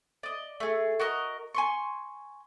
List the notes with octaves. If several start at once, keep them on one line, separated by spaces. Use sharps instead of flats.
D5 D#5
A3 G#4
F#4 A#4 D#5
G#5 C6 C#6